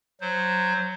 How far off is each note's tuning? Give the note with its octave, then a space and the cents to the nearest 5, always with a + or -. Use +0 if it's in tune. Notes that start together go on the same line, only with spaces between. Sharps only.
F#3 +0 C5 -5